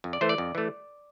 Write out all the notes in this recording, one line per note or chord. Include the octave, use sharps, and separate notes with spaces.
F2
D5
E3 A3 C5
D5
F2
E3 A3